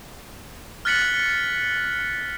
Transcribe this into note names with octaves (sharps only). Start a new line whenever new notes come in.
F6 F#6 A6 B6 C#7 F#7